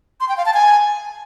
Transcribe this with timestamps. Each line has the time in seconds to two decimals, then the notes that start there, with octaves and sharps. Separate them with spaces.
0.20 C6
0.29 G5
0.37 F5
0.46 A5
0.54 G#5